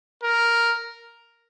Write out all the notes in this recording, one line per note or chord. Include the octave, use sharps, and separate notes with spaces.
A#4